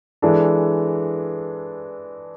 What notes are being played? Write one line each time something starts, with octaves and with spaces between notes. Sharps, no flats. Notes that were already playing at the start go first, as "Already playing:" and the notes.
E3 G#3 D4 A4